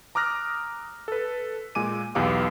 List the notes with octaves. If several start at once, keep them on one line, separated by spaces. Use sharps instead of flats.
A#5 D6 D#6 F6 F#6 A#6
A4 B4
A#2 G#3 G#5 D6 D#7
B1 E2 B3 G4 F5 D6